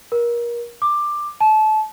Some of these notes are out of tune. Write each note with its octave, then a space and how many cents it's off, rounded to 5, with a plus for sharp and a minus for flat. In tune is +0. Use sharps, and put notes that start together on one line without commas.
A#4 +30
D6 +15
A5 -30